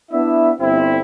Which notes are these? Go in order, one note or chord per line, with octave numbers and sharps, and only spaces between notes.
B3 D4 E4 E5
G1 C4 E4